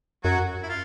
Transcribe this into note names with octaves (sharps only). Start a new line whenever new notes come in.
F#2 F#3 F#4
E4
F4